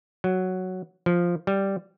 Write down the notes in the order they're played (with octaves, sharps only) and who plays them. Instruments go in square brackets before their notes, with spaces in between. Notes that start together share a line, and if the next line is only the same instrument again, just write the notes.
[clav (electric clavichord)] F#3
F3
G3